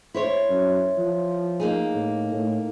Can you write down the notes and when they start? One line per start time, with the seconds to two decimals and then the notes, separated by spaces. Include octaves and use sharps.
0.14 E4 C5 C#5
0.49 F#2
0.98 F3
1.60 A#3 D#4 G#4
1.94 A2
2.32 A2